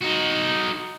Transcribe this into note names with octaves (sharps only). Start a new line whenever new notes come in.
D#4 F#4